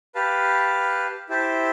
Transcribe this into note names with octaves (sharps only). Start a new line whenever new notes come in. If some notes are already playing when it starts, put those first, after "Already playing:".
G4 B4 F5 A5
E4 G4 C5 E5 A5